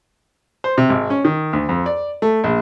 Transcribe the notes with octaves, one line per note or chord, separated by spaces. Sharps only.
C5
C3
G#1
C#4
D#3
D2
F2
D5
A3
A#1